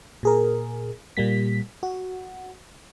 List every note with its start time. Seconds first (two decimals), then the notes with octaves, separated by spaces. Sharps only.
0.23 A#2 G#4 A#4
1.17 A#2 G3 A#3 B6
1.83 F#4